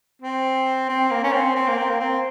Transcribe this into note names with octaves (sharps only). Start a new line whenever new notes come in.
C4
C4
A#3
C#4
C4
C4
A#3
C4
A#3
C4